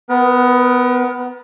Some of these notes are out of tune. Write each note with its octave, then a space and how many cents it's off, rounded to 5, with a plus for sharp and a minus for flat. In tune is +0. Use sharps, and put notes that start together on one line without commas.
B3 +15 A#4 +45